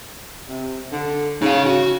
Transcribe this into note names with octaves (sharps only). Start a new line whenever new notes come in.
C3
D3
C#3 D#4 F5
F#4